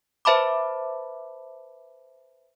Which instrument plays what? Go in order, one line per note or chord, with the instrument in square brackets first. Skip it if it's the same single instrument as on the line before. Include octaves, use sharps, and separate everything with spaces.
[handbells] B4 C5 E5 A5 B5 D6